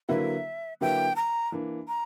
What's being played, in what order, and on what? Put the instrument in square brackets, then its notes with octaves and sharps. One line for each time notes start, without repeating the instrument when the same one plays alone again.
[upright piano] D3 F#3 A#3 E4 B4 [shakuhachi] E5
[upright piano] D3 F#3 A#3 E4 B4 [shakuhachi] G5
[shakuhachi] A#5
[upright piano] E3 A#3 D4
[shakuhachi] A#5